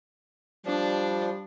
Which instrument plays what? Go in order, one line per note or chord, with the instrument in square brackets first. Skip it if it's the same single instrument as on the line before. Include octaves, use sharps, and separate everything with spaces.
[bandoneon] F3 [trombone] G3 [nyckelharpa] D4